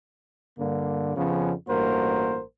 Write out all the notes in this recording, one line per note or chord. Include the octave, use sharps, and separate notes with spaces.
G2 D3 A#3
F2 C#3 F3 B3 C#4
A1 G2 A#3 F#4 A#4 C5